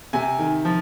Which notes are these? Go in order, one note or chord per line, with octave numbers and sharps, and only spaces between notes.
C3 G#5
D#3
F3